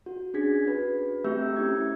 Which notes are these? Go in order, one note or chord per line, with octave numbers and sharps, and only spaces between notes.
F#4
C#4 D4 G#4 G#6 B6
F#4 B4
A3 C4 G4 E5 E6 G6
C#4 E4 G#6